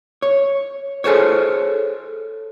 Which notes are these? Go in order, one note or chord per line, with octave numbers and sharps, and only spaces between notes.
C#5
G#4 A4 C5 C#5